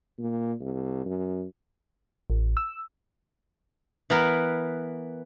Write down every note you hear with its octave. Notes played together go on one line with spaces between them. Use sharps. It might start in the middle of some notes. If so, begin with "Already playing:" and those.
A#2
C2
F#2
A1
E6
E3 B3 A#4